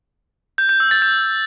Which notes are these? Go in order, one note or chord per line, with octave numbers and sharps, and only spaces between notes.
G6
G6
E6
A6
G6